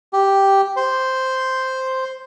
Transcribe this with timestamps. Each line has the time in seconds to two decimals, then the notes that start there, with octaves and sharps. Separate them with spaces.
0.13 G4
0.77 C5